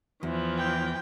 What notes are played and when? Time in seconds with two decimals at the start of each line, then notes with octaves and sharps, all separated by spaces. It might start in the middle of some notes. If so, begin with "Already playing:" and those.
0.23 E2 E3 F3
0.58 G5